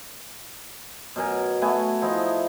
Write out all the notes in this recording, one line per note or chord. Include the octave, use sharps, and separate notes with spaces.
B2 F#3 A#4 G#5
A3 B3 F#4 G#5
F3 D#4 E4